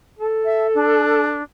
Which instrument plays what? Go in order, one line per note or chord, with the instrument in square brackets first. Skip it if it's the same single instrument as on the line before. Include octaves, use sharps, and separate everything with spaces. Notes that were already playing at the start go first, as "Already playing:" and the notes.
[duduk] A4
[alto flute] E5
D4